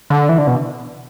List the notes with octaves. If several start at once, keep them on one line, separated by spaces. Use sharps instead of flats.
D3
E3
D3
B2